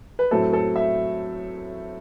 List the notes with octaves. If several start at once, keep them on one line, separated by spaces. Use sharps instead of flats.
B4
A2 F#3 A3 C4 A4
A4
E5